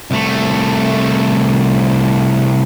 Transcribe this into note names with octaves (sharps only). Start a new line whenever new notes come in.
C2 A3